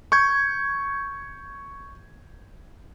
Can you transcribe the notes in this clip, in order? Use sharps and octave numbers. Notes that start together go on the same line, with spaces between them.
C#6 G6 G#6